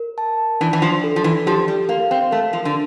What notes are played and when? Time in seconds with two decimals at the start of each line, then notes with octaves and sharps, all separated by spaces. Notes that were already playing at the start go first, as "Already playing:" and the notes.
Already playing: A#4
0.18 A5
0.61 E3 D4
0.73 E3
0.82 F3
1.04 A4
1.16 F3
1.24 E3
1.46 F3 G4
1.68 G3
1.89 A#3 F5
2.11 C4
2.31 A3 A#4
2.53 F3
2.65 D3